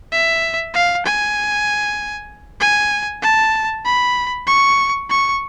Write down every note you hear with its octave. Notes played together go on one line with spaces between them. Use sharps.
E5
F5
G#5
G#5
A5
B5
C#6
C#6